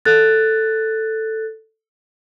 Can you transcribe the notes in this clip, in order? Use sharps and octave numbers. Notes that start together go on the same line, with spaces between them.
A4 F#6 A6